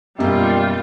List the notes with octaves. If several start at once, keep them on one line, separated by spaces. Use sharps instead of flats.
F#2 B2 G3 A#3 F4